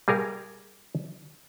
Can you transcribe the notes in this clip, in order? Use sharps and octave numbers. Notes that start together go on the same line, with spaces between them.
G3 G#4 A#4 F5